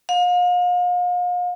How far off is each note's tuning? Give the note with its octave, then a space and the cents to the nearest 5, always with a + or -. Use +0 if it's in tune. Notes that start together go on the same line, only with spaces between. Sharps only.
F5 +40